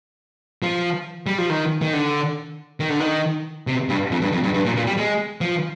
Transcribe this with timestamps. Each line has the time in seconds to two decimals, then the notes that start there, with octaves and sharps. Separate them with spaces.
0.63 F3
1.27 G3
1.38 F3
1.49 D#3
1.82 D#3
1.93 D3
2.80 D#3
2.90 D3
3.00 D#3
3.67 C3
3.89 G2
4.11 F2
4.22 G2
4.32 F2
4.44 G2
4.54 G2
4.65 A#2
4.76 A#2
4.87 G3
4.98 G#3
5.41 F3